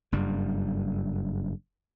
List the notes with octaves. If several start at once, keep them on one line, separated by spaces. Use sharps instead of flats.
F#1 G2 G3